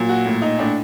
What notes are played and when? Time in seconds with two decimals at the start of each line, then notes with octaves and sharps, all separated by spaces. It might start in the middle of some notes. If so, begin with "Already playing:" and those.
Already playing: A#2 F#3
0.09 F#4
0.26 A2
0.42 D#4
0.59 A2 D4